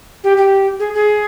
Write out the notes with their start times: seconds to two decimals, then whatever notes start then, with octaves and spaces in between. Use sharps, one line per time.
0.24 G4
0.37 G4
0.79 G#4
0.94 G#4